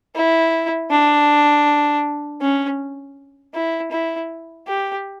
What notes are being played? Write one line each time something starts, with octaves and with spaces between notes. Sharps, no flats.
E4
D4
C#4
E4
E4
G4